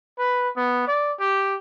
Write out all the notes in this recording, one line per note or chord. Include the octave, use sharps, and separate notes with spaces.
B4
B3
D5
G4